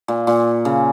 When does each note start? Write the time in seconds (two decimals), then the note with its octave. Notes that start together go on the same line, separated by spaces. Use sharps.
0.08 A#2
0.27 A#2
0.65 C#3